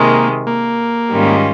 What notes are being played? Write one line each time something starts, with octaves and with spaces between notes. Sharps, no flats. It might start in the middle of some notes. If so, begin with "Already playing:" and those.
Already playing: C3 D#3 G#3 A#3
A#3
G#2 D#3 G3 C#4 F4